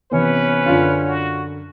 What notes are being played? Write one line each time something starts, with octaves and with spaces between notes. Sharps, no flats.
C3 E3 B3 C#4 B4
F#2 D3 F4
F#4